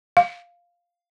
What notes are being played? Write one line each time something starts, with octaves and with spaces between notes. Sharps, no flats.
F5